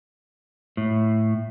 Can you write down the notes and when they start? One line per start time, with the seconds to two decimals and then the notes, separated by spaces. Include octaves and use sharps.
0.77 A2